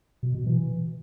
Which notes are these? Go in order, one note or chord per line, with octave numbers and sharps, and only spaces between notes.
B2
B2
E3